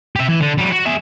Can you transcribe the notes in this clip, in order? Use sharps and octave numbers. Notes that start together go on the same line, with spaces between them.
G4 E5
E3
D3
F#3 G3
F#4
G#4 E5